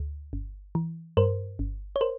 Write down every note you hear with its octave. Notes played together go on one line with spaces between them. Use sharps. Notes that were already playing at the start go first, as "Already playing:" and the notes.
Already playing: D2
G1
E3
G2 A#4 C5
G1
C#5
A#4 C5